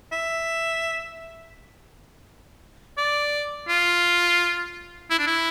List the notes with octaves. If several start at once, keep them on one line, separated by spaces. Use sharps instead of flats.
E5
D5
F4
E4
D4
E4